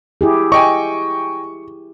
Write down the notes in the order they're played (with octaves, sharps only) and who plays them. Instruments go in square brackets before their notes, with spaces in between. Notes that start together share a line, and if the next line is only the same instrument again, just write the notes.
[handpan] E4 G4 G#4
[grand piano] D#5 G5 G#5 [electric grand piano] C#6